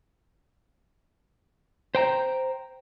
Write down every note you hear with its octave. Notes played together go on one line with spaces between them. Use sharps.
C5 G5 A#5